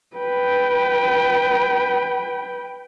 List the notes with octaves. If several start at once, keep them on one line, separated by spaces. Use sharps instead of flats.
B4 G5